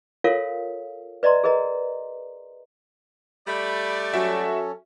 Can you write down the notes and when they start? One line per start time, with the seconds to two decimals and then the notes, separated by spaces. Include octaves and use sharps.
0.24 F4 A4 A#4 C#5 F5
1.23 B4 D5 D#5 A#5 C6
1.44 G#4 A#4 B4 D#5 A#5
3.47 G3 A3 D5 B5
4.14 F#3 C#4 F#4 A4 E5